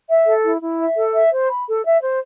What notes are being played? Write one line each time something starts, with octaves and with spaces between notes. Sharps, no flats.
E5
A4
E4
E4
E5
A4
E5
C5
B5
A4
E5
C5